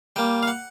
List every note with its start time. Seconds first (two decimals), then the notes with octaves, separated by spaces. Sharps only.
0.16 G3 A#3 G5
0.43 F5
0.48 F#5